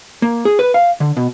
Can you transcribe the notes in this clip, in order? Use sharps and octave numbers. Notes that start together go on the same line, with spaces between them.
A#3
G#4
B4
F5
D3
B2